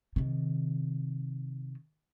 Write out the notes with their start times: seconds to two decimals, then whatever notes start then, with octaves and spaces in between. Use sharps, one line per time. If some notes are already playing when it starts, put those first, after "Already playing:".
0.16 C3 D#3